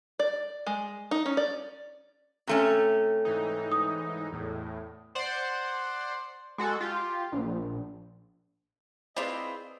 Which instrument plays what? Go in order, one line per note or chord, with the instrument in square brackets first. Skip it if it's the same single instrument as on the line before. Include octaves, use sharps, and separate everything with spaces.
[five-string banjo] D5
G#3
D#4
C#4
D5
[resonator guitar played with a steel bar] C3 A3 C#4
[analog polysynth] G#2 E3 D#4
[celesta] D#6
[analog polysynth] E2 A2
C5 D5 F#5 C6
G#3 F#4 A4
F4 G4
A#1
[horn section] C4 G#4 D#5 [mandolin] E4 F4 [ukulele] B4 C5 [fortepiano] D5